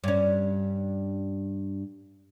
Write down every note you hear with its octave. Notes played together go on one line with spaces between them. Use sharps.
G2 C#4